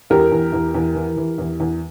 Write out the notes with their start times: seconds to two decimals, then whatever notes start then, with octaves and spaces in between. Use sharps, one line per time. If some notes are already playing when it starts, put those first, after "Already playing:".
0.10 E2 G4 A#4
0.31 E2
0.53 E2
0.74 E2
0.95 E3
1.17 E3
1.38 E2
1.60 E2